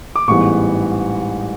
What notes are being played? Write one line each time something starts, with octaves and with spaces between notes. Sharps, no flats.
D6
A1 G#2 E3 G3 B3 C#6